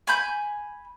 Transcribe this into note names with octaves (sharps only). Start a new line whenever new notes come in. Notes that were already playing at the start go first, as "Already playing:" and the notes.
G#5 B5 G6